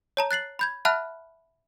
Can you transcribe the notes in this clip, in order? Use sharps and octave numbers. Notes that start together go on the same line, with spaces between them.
C#5 A5 A#5
F#6 A6 C7 F#7
B5 G6 G#6
E5 F#5 A5 B5 F6 F#6